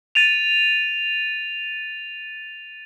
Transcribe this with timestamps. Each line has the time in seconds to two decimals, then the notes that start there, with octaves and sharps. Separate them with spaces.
0.15 A6 D#7 F7